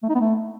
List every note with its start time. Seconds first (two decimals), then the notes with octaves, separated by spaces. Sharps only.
0.03 A3
0.09 D#4
0.15 B3
0.21 A3